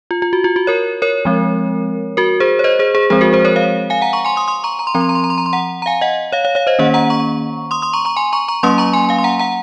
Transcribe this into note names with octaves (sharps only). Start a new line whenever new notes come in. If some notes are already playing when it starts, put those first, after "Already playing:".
F4
F4
F#4
F4
F#4
A#4 C#5
A#4 C#5
F3 G#3 C4
F#4 A#4
G#4 C5
C#5
C5 D#5
G#4 C5
G#4 C5
F3 G#3 C4 G#4 C5
F#4 A#4
G#4 C5
A#4 C#5
C#5 F5
F5 G#5
F#5 A#5
A#5 C#6
G#5 C6
C6 D#6
C6 D#6
A#5 C#6
A#5
C6
F3 C4 A#5
C6
A#5
C6
A#5
C6
A#5
C6
F#5 A#5
A#5
F5 G#5
D#5 F#5
C#5 F5
C#5 F5
C#5 F5
C5 D#5
D#3 A#3 C#4 D#5 F#5
F#5 A#5
A#5 C#6
C6 D#6
C6 D#6
A#5 C#6
A#5 C#6
G#5 C6
A#5 C#6
A#5 C#6
F#3 A#3 C#4 C6 D#6
A#5 C#6
G#5 C6
F5 G#5
C6
F#5 A#5
F#5 A#5